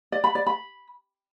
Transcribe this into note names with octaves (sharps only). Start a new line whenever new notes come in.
D5
B5
D5
B5